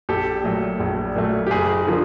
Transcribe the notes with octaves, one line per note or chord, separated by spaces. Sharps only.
A#1 G4 A4
A#2 F#3 A3
A#1
A#2 F#3 A3
G4
F#1 G#4
D3 F3 A#3